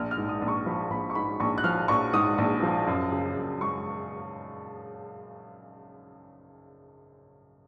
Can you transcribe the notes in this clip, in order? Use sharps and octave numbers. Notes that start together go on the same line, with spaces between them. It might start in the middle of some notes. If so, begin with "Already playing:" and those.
Already playing: A#1 F6
F6
G#2
D#6
A#1
C#6
F3 B5
A#1 B5
C#6
G#2 B5
A#1 C#6
F#6
F3 F6
A#1 C#6
G#2 D#6
A#1
F3
F#2
C#3
F#2
G#3 C#6